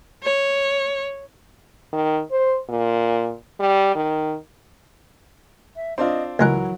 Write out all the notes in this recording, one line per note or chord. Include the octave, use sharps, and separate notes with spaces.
C#5
D#3
C5
A#2
G3
D#3
E5
C4 D4 F4 D#5
C#2 E3 F#3 G#3 A#4 F#5